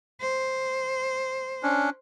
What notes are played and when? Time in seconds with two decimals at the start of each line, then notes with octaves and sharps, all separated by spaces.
0.21 C5
1.63 C#4 D4